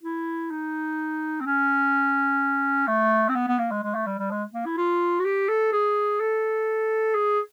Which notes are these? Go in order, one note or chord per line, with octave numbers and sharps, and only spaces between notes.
E4
D#4
C4
C#4
A3
C4
B3
B3
A#3
G#3
G#3
A3
G3
G3
G#3
A#3
E4
F4
F#4
G4
A4
G#4
A4
G#4